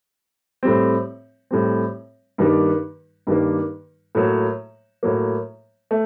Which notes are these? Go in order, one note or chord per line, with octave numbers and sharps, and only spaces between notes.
A2 G3 C4
A2 G3 C4
G2 D#3 G3 A#3
G2 D#3 G3 A#3
A2 F#3 A#3
A2 F#3 A#3
A3